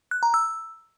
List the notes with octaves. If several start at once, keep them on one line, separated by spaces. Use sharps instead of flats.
F#6
A#5
E6